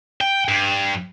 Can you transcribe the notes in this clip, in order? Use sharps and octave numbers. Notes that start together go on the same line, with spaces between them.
G5
G2